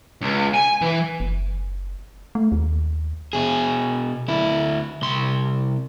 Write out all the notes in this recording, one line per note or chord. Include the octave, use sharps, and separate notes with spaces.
C#2
G#5
E3
F#1
A3
D#2
B2 G#4
D2 E4
C2 C6